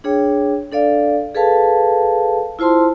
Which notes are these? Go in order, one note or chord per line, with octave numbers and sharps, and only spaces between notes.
D4 G#4 C#5 G5
D4 A4 D5 F5
G#4 A4 B4 F5 A5
E4 F4 C5 A5 C6